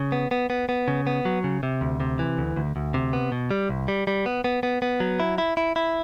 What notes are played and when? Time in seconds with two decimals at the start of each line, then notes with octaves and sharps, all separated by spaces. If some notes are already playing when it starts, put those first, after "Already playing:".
Already playing: C#3
0.12 B3
0.31 B3
0.50 B3
0.69 B3
0.88 C#3
1.07 B3
1.25 F#3
1.44 C#3
1.63 C3
1.81 D2
2.00 C3
2.19 E3
2.38 D2
2.56 D2
2.76 D2
2.94 C3
3.13 B3
3.32 B2
3.51 G3
3.69 C2
3.88 G3
4.07 G3
4.26 B3
4.44 B3
4.63 B3
4.82 B3
5.00 F#3
5.20 E4
5.38 E4
5.57 E4
5.76 E4